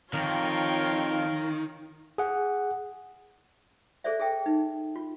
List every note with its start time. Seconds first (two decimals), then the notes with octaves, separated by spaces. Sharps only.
0.13 F2 D#3 F4 A#4 C#5 F5 G5
2.18 G#4 F#5
4.04 G#4 A4 C5 D5 E5
4.20 G#4 A4 E5 G5
4.46 D#4
4.96 F4